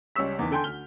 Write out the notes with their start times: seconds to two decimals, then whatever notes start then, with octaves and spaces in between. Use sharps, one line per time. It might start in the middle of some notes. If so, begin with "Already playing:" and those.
0.16 C#2 G3 C#4 C#6 E6 B6
0.39 E2 D#3 E3 B3
0.51 D3 A4 G5 G#5 C6 G6
0.64 D2 F6 G7